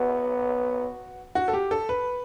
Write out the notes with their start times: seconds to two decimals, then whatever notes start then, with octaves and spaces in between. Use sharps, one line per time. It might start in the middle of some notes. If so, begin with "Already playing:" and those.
Already playing: B3 F#4
1.35 F#4
1.48 A4
1.54 G4
1.71 A4
1.89 B4